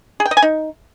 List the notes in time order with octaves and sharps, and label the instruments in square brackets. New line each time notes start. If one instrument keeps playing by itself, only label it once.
[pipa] G#4
G5
D#5
G#5
D#4